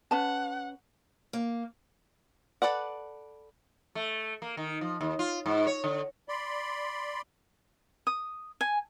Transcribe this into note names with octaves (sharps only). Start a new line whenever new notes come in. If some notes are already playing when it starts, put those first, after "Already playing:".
C#4 B4 F#5 A5
A#3
A4 B4 D5 F#5
A3
A#3
D#3
F3
D#2
F4
G#2
C#5
D3
D5 B5 C6
D#6
G#5